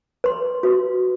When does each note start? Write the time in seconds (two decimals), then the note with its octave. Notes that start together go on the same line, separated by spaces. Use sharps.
0.24 B4 C6
0.63 F#4 B4